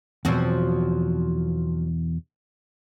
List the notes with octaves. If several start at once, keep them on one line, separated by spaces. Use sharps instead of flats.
E2 B2 F3 F#3 C4